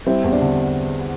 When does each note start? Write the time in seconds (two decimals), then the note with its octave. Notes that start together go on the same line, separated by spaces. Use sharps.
0.06 G3 C4 E4
0.24 E2
0.32 D4
0.41 D3